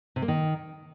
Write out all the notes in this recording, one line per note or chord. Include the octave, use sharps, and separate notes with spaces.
C3
A#3
D#3